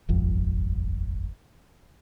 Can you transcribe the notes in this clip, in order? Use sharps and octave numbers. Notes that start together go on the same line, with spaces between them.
D#1 G#1 F2